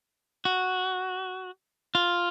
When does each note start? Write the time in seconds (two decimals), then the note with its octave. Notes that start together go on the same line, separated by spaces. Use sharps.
0.45 F#4
1.95 F4